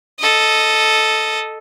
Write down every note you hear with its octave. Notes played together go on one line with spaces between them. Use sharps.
A4 D#5